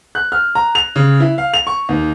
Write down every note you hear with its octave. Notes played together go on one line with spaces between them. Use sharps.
F#6
F6
A#5
F7
C#3
E4
F5
F7
C#6
D#2